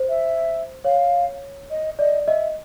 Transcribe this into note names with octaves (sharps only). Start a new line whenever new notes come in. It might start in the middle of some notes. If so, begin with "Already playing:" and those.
Already playing: C5
E5
C#5 F5
D#5
D5 D#5
D#5 E5